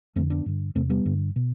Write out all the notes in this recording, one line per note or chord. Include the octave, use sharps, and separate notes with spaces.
F2 D3 A3 C4
B3 D4
G2 D3
E2 C3 A3 C4
G3 B3
G2 D3
B2